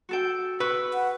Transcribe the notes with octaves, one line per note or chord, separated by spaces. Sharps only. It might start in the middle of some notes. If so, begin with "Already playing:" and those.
F#4 A4 G5
B4 C#6 E6 F#6
F#5